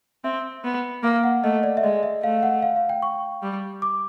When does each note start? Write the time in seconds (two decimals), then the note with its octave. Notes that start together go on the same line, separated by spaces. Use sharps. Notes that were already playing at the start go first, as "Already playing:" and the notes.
0.24 C4 E5
0.64 B3
1.03 A#3 F5
1.24 F#5
1.43 A3 D#5
1.63 D5
1.77 E5
1.83 G#3 D#5
2.03 E5
2.23 A3 F5
2.43 F#5
2.62 F5
2.76 F5
2.89 G5
3.02 C#6
3.42 G3
3.82 D6